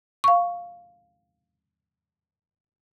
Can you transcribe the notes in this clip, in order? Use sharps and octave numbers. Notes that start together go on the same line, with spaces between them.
F5 C#6